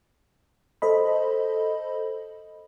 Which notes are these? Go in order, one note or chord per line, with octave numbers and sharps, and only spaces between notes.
A4 C5 D#5 B5